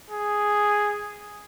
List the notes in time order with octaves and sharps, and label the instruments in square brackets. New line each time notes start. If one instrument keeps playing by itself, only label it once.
[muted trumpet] G#4